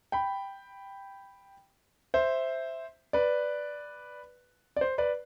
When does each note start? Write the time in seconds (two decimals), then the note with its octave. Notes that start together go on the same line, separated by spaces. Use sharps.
0.12 G5 B5
2.14 C5 E5
3.13 B4 D5
4.77 D5
4.81 C5
4.98 B4 D5